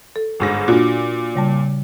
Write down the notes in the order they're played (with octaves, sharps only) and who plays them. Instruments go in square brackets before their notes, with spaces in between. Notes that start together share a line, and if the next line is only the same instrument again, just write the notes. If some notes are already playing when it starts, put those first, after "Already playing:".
[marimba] A4
[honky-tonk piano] G1 G#2 A#6
[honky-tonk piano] A#2 [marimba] D4 F4 F#4
[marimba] C#3 G3 A5